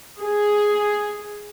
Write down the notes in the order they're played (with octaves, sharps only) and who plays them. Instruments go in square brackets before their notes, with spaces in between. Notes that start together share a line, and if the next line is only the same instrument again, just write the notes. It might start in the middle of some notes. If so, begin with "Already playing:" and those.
[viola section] G#4